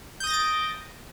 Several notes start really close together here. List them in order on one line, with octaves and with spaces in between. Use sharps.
G6 D#6 A#6 A6 D7